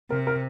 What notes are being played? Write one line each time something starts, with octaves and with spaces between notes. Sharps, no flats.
C3 A#4
A#4